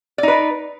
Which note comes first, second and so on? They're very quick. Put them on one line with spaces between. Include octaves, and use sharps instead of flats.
D5 D#4 B4